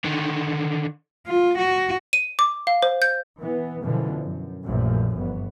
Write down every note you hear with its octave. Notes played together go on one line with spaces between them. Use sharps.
D3 D#3
F4
F#4
D#7
D6
F5
C5
G6
E3 B3
F#2 B2 D3 E3 F3
F#2
A#1 F#2 A#2 E3 F3 A3
G1 B3